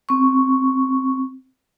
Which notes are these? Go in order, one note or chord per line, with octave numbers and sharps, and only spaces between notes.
C4 C#6